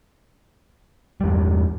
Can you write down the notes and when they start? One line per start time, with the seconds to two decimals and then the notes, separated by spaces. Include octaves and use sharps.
1.21 G3
1.24 E2
1.27 G2